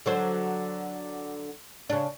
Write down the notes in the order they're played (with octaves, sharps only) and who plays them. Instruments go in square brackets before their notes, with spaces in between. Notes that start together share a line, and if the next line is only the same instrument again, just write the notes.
[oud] D3 F#3 C5
C#3 D4